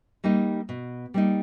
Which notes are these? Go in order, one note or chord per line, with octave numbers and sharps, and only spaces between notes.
G3 A#3 D#4
B2
G3 A#3 D#4